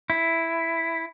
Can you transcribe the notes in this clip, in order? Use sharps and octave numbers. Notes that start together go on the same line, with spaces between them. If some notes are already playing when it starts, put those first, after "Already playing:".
E4